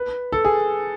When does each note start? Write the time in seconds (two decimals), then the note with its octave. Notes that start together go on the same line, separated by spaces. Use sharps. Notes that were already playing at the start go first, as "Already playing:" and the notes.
Already playing: B4
0.32 A4
0.45 G#4